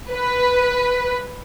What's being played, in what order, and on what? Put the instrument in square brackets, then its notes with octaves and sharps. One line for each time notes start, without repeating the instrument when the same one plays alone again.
[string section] B4